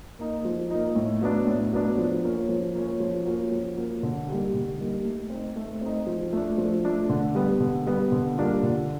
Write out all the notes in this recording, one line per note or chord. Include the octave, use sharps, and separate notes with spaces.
A#3 D#4
F3
A#3 D#4
A2
F#3 B3 D4
A2
F#3 B3 D4
F3
A#3 C#4
F3
A#3 C#4
F3
A#3 C#4 F#4
F3
A#3 C#4 F#4
D3
G3 A#3 D#4 G4
D3
G3 A#3 D#4 G4
A3
C4 D#4
A3
C4 D#4
F3
A3 D4
F3
A3 D4
D3
G3 B3
D3
G3 B3
D3
G3 A#3 D4 F4
D3